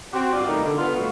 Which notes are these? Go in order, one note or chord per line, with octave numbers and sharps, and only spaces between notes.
C4 F#4 G4
G2 F4 D5
B2 D#3 G3 A3 D#4 A#4
D3
B3 F4
D2 A#2 G3 A3 B3 F#4